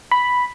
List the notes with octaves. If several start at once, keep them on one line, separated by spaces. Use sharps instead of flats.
B5